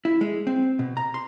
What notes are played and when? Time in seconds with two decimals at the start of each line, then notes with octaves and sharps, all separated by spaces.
0.05 E4
0.21 G#3
0.47 C4
0.79 B2
0.97 A#5
1.14 C6